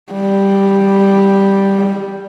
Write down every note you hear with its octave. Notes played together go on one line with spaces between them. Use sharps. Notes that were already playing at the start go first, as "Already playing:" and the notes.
G3